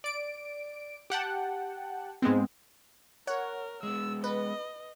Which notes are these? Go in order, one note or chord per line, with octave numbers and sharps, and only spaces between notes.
D5 D7
G4 F#5 G5 A5
G#2 G#3 B3 C4
A#4 C#5 F#5
G#3 B3 E6
B4 D#5